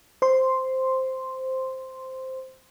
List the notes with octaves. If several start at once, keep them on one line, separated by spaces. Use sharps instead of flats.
C5 C6